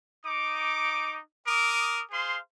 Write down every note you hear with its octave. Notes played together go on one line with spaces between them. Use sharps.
D#4 D6
A#4 D6 D#6
G#4 C5 F5 C6